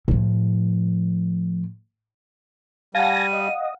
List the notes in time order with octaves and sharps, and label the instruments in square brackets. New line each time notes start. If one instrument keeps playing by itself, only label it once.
[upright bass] A2 F3
[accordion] G3 [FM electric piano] F5 F#5 [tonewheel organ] G#5 A5 A#6 [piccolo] D#7
[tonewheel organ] D#5